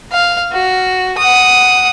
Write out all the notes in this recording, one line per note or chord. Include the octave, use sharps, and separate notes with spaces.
F5
F#4
F#5 D#6